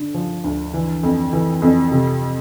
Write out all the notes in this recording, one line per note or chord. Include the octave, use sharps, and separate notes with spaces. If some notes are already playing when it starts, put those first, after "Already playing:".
Already playing: D3
F3
D2
E3
F2
E3
F2
C3